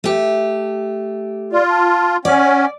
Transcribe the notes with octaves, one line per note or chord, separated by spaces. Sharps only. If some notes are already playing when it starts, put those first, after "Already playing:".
A3 G4
F4 D5
A5
C#4 D5 F#5